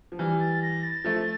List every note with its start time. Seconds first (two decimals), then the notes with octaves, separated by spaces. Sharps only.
0.12 F3
0.19 E3 G3 F6
0.40 A6
0.62 A#6
0.83 A6
1.04 F3 A3